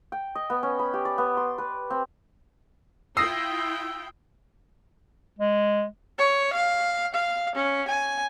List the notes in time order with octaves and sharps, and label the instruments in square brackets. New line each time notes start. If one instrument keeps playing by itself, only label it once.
[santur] G5
D#5
B3
C#4
B5
G4
D5
B3
C6
B4
C4
[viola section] E4 F4 G5 [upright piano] D#6 A#6 [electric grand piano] E6 C7
[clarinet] G#3
[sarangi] C#5
F5
F5
C#4
G#5